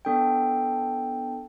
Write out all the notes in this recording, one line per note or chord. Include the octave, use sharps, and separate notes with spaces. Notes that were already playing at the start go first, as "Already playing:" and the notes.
B3 D4 A4 G5